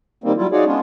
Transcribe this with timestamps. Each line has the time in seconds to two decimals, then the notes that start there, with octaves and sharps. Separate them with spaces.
0.24 D#3 G3 A#3 C4
0.37 F#3 G3 E4 F4
0.52 D#4 F4 F#4 G#4 C#5 D5
0.65 G#3 B3 C#4 D4 F4